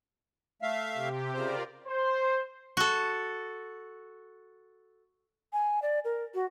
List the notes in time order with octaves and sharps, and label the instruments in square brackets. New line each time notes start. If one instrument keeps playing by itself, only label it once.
[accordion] A3 E5 F5
[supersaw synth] C3 G4
[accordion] C#3 C5 [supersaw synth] F4 A#4 D5
[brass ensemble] C5
[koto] F#4 A4
[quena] G#5
D5
A#4
F#4